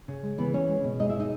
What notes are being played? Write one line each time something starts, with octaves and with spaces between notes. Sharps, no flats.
C#3
G#3
E3 B3 B4
C#3 C#4 C#5
G#3
B2
G#3 D#4 D#5
E4 E5
B2
D#4 D#5